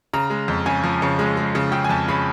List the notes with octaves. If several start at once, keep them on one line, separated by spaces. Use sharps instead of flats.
C#3 A#5
G#3
F2
C#3 G#5
F3
C#3
G#3
G#3
C#3
C#3 G5
G#5
F2 A5
C#3 B5